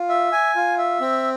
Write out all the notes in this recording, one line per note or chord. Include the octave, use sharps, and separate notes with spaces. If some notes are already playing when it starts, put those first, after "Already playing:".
Already playing: F4
E5
G#5
F4
E5
C4